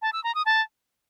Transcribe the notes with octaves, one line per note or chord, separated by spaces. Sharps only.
A5
E6
A#5
D#6
A5